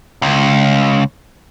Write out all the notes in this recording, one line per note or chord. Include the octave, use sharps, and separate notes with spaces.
C#2